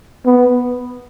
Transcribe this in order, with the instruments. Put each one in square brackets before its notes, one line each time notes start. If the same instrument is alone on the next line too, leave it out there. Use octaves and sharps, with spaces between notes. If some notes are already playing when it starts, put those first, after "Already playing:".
[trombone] B3